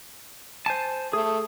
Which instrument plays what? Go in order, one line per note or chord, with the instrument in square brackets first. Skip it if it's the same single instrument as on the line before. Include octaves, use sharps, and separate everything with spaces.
[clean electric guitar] C5 G#5 A5
[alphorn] A3 [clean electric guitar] G#4